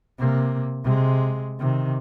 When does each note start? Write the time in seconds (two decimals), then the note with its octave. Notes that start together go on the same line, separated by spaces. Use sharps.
0.19 C3 A#3
0.84 C3 G#3
1.59 C3 D#3